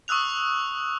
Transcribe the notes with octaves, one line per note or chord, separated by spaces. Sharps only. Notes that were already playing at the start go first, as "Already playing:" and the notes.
C#6 D#6 E6 F#6 F7